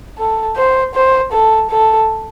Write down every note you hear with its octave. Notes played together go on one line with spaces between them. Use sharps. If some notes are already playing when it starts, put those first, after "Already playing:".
A4
C5
C5
A4
A4